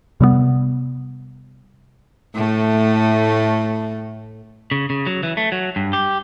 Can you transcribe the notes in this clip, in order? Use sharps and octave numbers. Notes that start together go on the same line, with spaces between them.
C3 G3 G#3 B3
A2 A3
C#3
C#3
F#3
E3
A3
F#3
G2
G4